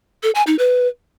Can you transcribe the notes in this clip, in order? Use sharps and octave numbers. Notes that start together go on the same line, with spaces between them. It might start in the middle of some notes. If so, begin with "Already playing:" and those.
A4
G#5
D#4
B4